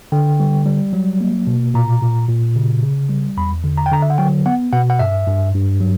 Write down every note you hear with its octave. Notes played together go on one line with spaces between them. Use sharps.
D3 G5
G3
G3
F#3
A#3
B2
A#2 A#5
A#2
A#2
C#3
C#3
G3
E2 B5
D3
A#5
G5
D3 A#5
E5
F#5
F#3 G5
B3 F#5
B2 F#5
F#5
G2 E5
G2
G2
F#3